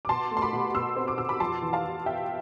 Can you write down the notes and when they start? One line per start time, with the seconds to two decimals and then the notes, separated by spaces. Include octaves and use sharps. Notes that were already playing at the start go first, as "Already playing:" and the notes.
0.05 D6
0.09 B2 A5 C6
0.31 A3
0.37 C6
0.42 B5 D6
0.53 B2
0.75 B2 C6 E6
0.96 C4
1.08 D6
1.18 B2 E6
1.29 B5 D6
1.40 F2 A5 C6
1.62 E3
1.73 F5 A5
1.84 E3
2.06 B3 E5 G5